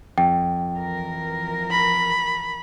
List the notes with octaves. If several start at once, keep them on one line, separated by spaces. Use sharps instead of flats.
F2 G5
E3 F3 A#4
B5